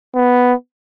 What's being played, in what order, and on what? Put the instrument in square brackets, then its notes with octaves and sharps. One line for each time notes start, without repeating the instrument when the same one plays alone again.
[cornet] B3